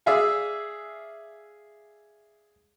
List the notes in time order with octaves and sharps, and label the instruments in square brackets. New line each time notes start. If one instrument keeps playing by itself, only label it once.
[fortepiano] G#4 D5 E5 F5 G#5